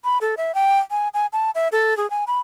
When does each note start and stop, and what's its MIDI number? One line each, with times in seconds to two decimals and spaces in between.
0.04 0.18 83
0.21 0.35 69
0.37 0.54 76
0.55 0.79 79
0.91 1.08 80
1.14 1.26 80
1.33 1.51 81
1.55 1.68 76
1.72 1.96 69
1.97 2.09 68
2.10 2.24 80
2.27 2.39 83